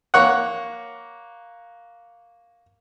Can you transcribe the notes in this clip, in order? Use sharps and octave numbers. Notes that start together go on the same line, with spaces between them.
A#3 C#5 F#5